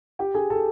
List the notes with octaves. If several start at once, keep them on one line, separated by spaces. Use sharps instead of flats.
G4 G5
G#4 G#5
A4 A5